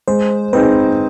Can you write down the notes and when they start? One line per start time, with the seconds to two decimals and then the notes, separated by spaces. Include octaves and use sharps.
0.08 G#3 C5
0.53 C4 D#4 G#4 B4